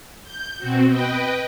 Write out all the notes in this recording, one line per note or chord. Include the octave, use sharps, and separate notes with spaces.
G6
B2 C4 F#4
B4 D#5 G5